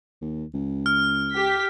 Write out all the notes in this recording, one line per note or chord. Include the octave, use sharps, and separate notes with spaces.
D#2
C#2
F6
G4 B6